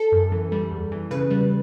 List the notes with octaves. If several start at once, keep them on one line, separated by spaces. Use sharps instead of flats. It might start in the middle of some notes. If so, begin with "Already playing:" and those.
Already playing: A4
F#2
E3
G3
E2
E3
C#3 B4
G3